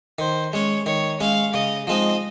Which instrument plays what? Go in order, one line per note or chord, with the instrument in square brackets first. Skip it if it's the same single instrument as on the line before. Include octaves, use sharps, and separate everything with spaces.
[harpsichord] D#3 [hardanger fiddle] C5
[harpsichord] G#3 C#4 [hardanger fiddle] C#5
[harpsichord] D#3 [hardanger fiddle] C#5
[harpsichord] G#3 C#4 [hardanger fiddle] F5
[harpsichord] C#3 [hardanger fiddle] D#5
[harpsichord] F3 G#3 C4 D#4 [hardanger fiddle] D#5